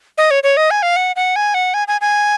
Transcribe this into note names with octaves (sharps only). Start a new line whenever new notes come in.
D#5
C#5
C#5
D#5
G#5
F5
F#5
F#5
G#5
F#5
G#5
G#5
G#5